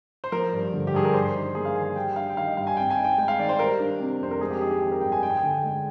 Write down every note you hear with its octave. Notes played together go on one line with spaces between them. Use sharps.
C5
F3 A#4
G2
D3
G4
G2 G#4
A#4
D4 C5
D#3
A#3 G#4
F5
D#3 G#5
G#5
G3 G5
D4 F5
G5
D#3 F5
D#5
G2 F5
G#5
C4 G5
G#5
D#4
G5
G#3 G5
F5
D#3 D5
C5
G3 A#4
D4
C3
F2 C5
A#4
G#3 G#4
G4
D#4 G#4
G4
D#3 G#4
A#4
G2 G5
G#5
D#4 G5
G#5
G5
D3
G#3